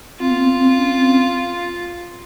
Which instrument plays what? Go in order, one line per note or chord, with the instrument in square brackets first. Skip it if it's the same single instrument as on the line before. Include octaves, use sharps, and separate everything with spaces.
[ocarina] C4 [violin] F4
[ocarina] B3
C4
C4
C#4
C4